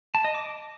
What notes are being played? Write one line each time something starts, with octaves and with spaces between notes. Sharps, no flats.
A5
D#5
D6